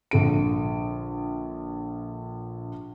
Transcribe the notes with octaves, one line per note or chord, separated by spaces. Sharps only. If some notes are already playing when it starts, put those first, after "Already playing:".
A#1 D3 D7